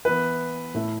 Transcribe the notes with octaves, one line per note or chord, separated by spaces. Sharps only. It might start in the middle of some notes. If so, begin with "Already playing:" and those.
E3 B3 E4 B4
A2 A3 E4